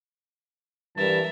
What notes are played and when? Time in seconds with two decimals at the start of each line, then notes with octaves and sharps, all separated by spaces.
0.97 G2 E3 A#4 E5 A5